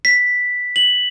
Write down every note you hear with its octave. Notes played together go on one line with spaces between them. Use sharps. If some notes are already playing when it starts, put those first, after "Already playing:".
B6
F#7